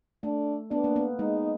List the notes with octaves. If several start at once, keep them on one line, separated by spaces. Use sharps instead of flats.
A3 D4
B3 D4
A#3
B3
G#3 D#4